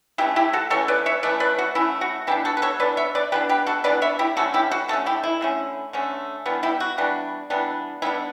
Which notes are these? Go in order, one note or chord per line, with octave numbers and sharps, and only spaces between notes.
E3 A3 C#4 E4 G4
E4 G4
F#4 A4
E3 A3 C#4 A4 C#5
B4 D5
C#5 E5
E3 A3 C#4 B4 D5
B4 D5
F#4
E3 A3 C#4 E4
F#4
E3 B3 D4 E4 G4
F#4 A4
B4
A4 C#5
E3 B3 D4 B4 D5
C#5 E5
B4 D5
E3 B3 D4 G4 B4
G4 B4
F#4 A4
E3 B3 D4 B4 D5
C#5 E5
E4 G4
D3 A3 C#4 F#4 A4
E4 G4
F#4
D3 A3 C#4 F#4 A4
E4 G4
E4
D3 A3 C#4
D3 A3 C#4
E3 G3 B3 D4
E4 G4
F#4
E3 G3 B3 D4
E3 G3 B3 D4
E3 G3 B3 D4 E4